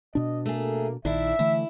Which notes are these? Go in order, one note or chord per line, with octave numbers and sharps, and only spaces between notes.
B2 D4 D#5
A3 A#3 G#4
A#1 D#3 D4 E4 E5
D3 E3 A3 E4